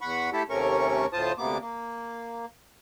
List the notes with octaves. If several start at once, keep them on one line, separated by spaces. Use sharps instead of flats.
E2 F#5 B5 C#6
A3 E4 G4 A4 E5
D#2 C3 A3 C#4 A#4 C#6
D2 A2 F4 C5 A5 D#6
D2 C3 A#3 B3 D6
A#3